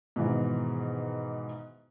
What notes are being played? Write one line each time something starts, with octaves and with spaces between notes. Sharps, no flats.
G#2 B2 D#3 E3